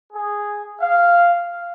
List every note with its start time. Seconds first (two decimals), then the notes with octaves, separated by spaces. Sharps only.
0.13 G#4
0.80 F5